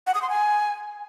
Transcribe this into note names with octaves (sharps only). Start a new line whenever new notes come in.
F#5
D#6
C6
G#5